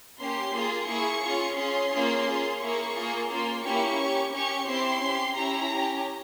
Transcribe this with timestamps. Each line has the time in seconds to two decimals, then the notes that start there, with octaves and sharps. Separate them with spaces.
0.19 A#3 C#4 G4 C6
0.54 A#3 F4 G#4
0.88 A#3 E4 G#4 C#6
1.23 C#4 F4 G#4
1.57 C#4 F4 G#4 C6
1.93 A#3 C#4 F4 G#4
2.27 C#4 F4 G#4
2.61 A#3 E4 G#4 C#6
2.95 A#3 F4 G#4
3.30 A#3 C#4 F4 C6
3.64 A#3 C#4 E4 G4 C#6
3.98 C#4
4.04 G4
4.33 C#4 G4 C#6
4.68 C4 E4 G4 C6
5.03 C#4 G4
5.37 C#4 E4 G4 A#5
5.72 C#4 G4